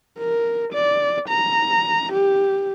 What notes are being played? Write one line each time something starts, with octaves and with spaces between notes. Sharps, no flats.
A#4
D5
A#5
G4